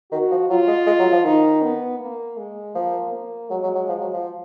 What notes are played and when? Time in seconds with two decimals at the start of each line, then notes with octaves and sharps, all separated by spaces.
0.11 D#3 F#4
0.31 F3
0.49 F#3 F4
0.68 G#3
0.87 G#3
0.99 F#3
1.12 F3
1.24 D#3 D#4
1.62 B3
1.99 A#3
2.37 G#3
2.75 F3 A#3
3.13 A#3
3.50 F#3 G#3
3.63 F#3
3.75 F#3
3.89 F3
4.01 F#3
4.13 F3